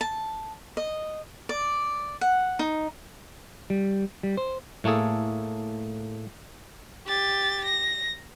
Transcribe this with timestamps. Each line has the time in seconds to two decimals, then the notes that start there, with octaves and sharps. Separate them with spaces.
0.01 A5
0.77 D#5
1.49 D5
2.21 F#5
2.59 D#4
3.70 G3
4.23 G3
4.37 C5
4.84 A2 A3 A#3 G#4 A4
7.07 G4 A6
7.64 A#6